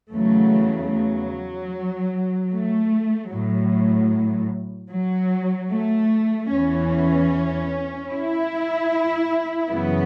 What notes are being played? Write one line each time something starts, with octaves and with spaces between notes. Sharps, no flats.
E2 C#3 F#3 A3
F#3
A3
A2 F#3
F#3
A3
E2 E3 C#4
E4
F#2 C#3 E3 B3